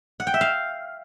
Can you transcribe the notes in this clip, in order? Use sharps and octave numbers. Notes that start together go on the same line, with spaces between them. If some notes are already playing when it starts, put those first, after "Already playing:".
F#5
G5
E5
F5